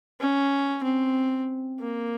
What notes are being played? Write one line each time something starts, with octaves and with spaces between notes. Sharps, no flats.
C#4
C4
A#3